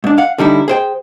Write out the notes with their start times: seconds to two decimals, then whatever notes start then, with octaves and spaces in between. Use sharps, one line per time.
0.04 G#2 D4
0.18 F5 F#5
0.38 D3 G3 D#4 E4
0.68 G#4 C5 G5